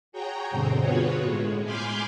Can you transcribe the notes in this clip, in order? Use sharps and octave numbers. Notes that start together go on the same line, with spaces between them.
F#4 G#4 C#5 G5 A#5
G2 B2 D3 C4 C5
B3 F4 F#4 G#4 B4 C#5
A2 G#3
G#5 B5 C6 D6 F6 G6